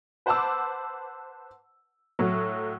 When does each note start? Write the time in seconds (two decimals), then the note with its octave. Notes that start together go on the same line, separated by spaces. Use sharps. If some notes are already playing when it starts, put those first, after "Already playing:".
0.26 B4 C5 F#5 A5 D6 E6
2.19 A2 F#3